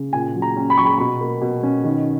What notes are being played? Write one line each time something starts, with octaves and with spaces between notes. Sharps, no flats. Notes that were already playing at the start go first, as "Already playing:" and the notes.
Already playing: C#3
A#2 G#5
F#3
A#5
C#4
B5
F#3 C#6
B5
B2 B5
A#3
B2
C#4
D#3